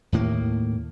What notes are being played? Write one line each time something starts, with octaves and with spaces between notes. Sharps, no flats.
D#2 A2 A#3